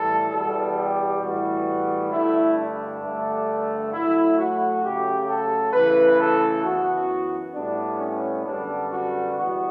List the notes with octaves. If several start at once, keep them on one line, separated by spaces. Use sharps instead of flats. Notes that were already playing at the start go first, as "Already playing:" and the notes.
Already playing: A2 E3 G3 A4
E2 B2 G3 B3 A4
G4
A2 E3 G3 B3 F#4
G2 D3 A3 E4
D4
G2 D3 A3
A2 F#3 A3 E4
F#4
C#3 F#3 A3 G4
A4
C#3 E3 A3 B4
A4
F#2 E3 B3 F#4
A2 G3 B3 D4
C#4
F#2 D3 G3 B3 D4
F#4
E2 B2 G3 B3 F#4